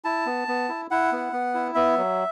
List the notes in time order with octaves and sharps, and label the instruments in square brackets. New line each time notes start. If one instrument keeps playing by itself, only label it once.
[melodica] E4 A5
B3
B3
E4
E4 F#5
B3
B3
E4
B3 E5
F#3